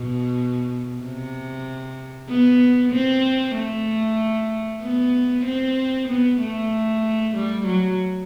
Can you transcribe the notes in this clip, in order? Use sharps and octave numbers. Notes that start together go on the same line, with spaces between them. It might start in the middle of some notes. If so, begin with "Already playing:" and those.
Already playing: B2
C3
B3
C4
A3
B3
C4
B3
A3
G3
F#3